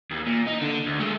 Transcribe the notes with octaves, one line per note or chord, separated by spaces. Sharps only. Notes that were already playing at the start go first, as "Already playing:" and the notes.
D#2
A#2
D#4
D3
D2
G#3 A3